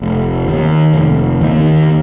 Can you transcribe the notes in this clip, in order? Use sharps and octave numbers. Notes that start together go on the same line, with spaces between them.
F1
D#2 D#3 A#3
F1
D#2 D#3 A#3